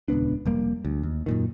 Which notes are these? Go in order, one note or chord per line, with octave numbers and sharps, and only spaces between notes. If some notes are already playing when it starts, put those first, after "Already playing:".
D#1 C#2 B3 D4
F1 G3 A#3
D2
D#2
F#2 A#2 D#3